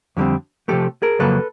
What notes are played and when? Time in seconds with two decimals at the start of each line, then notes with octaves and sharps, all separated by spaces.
0.17 F2 D3 G3 C4
0.68 C3 F3 A3 G4 A4
1.02 G#4 A#4
1.19 F2 C#3 F#3 A#3 A4 B4